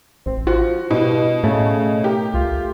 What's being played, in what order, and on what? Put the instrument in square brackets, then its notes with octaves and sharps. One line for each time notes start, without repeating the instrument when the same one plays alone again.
[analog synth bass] A1 [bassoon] C4
[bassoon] F3 [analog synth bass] F4 [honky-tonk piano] F#4
[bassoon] G2 [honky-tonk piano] B2 [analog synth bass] E4
[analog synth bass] A2 [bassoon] C#3 [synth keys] A3
[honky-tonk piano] G4 [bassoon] A#4
[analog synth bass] C#2 [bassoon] F4